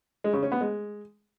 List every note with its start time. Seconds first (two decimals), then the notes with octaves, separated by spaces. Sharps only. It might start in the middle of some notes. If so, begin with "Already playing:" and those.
0.24 G#3
0.33 C#3
0.43 C#4
0.52 B3
0.61 G#3